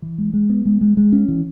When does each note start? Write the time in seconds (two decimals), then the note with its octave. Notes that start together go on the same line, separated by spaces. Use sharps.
0.02 E3
0.18 G#3
0.33 G#3
0.50 B3
0.65 G#3
0.81 G#3
0.97 G#3
1.12 C#4
1.28 E3